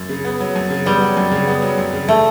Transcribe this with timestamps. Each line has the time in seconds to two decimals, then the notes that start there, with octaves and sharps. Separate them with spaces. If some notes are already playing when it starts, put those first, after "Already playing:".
Already playing: F#2
0.09 C#3
0.25 B3
0.40 F#3
0.56 F#2
0.70 C#3
0.86 G3 B3
1.01 F#3
1.17 F#2
1.32 C#3
1.47 B3
1.62 F#3
1.78 F#2
1.93 C#3
2.08 A3